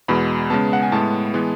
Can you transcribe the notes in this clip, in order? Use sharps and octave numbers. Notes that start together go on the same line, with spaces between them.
E2 B2 G#3 B5
C#3 G#3 B3 A5
F#5
G#5
A2 G#3 B3 A5
E3 G#3 B3